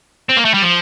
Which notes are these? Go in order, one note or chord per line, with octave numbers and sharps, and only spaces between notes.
C4
A#3
A3
G3
F3